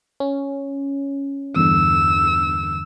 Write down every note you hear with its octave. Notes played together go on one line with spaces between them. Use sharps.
C#4
E2 G2 D3 E6